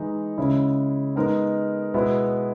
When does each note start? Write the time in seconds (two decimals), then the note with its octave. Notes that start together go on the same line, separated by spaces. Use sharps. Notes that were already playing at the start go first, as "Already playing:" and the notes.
Already playing: E3 G#3 D#4
0.38 C#3 G#3 C#4 E4
1.16 G#3 B3 D#4 A#4
1.94 B2 G#3 B3 E4